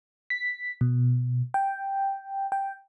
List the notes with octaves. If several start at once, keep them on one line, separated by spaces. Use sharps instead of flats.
B6
B2
G5
G5